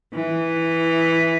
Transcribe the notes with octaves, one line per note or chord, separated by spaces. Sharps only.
E3